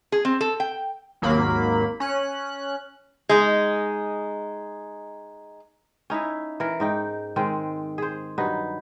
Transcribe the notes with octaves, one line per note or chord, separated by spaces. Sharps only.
G#4
C4
A4
G5
G#1 D#2 F#3 A#3 B5
C#4 F#6
G#3 D#4
C#4 D#4 E4 E5
E3 A#4
G#2 D#4 G5
D#3 G#3 C4
G#4 C5
G2 F#3 D#4 B4